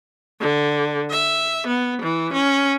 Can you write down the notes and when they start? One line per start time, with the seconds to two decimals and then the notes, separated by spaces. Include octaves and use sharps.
0.40 D3
1.11 E5
1.67 B3
2.02 E3
2.34 C#4